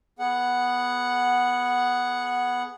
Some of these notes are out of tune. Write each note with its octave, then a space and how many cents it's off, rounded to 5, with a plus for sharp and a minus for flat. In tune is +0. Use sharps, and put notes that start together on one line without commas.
B3 +0 G#4 +20 F#5 +0